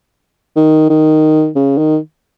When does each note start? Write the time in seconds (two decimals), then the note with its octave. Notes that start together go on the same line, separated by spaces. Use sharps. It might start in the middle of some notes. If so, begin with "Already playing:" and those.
0.56 D#3
0.90 D#3
1.55 C#3
1.78 D#3